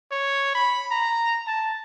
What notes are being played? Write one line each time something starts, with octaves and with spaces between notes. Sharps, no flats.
C#5
B5
A#5
A5